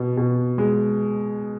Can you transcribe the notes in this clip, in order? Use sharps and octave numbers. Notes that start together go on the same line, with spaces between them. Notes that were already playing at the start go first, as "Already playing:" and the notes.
Already playing: B2
B2
G#3